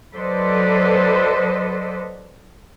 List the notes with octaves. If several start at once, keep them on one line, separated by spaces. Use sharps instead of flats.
F#3 A4 B4 C5 D5 D#5